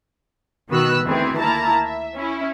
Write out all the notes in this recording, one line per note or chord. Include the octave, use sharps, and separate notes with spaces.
B2 D#3 B3 F#4 E6 F#6
D2 D#3 E3 C4 G#4
A#3 E4 A5 A#5
E5
C#4 E4